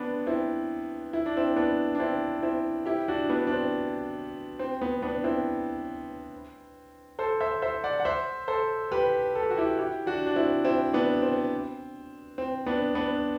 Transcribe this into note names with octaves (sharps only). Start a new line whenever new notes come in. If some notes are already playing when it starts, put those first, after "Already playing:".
Already playing: B3 C4 D4
C4 E4
E4
D4
C4 E4
B3 D4
D4
C4 E4
C4 E4
E4 G4
D4 F#4
B3 D4
D4
C4
C4
B3
B3 D4
C4 E4
A4 C5
C5 E5
C5 E5
D5 F#5
F#5
C5 E5
A4 C5
G4 B4
A4
G4
F#4
E4 G4
E4 G4
D4 F#4
D4
C4 E4
C4 E4
B3 D4
C4
C4
B3 D4
B3 D4